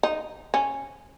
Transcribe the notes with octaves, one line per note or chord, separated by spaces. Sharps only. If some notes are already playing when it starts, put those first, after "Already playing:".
D#4
C#4